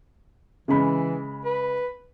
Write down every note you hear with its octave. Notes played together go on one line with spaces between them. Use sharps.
C#3 E3 G#3 B5
B4